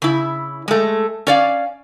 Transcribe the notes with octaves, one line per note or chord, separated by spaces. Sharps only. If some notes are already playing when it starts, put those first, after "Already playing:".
C#3 E4
G#3 A3
C#4 D5 F5